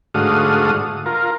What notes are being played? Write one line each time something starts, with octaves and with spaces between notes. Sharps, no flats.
G#2 D3 A3 F#4 F5 D#6
F4 A#4